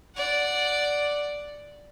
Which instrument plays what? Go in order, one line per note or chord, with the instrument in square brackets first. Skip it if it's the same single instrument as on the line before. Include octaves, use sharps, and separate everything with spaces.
[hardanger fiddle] D5 F#5